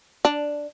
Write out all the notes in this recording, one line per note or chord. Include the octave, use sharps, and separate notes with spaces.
D4